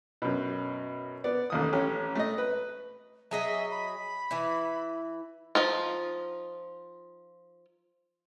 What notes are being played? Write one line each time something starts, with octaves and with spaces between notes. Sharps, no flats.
F#2 B2
B3 D5
A1 D#2 D#6
A1 C#4 G4
A3 D#5
B4
F#3 G#4 D#5 E5
B5
E3 E4
F3 D#4 F4